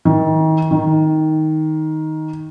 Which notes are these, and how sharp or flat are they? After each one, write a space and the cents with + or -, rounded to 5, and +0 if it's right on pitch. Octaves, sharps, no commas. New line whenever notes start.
D#3 +35
D#3 +10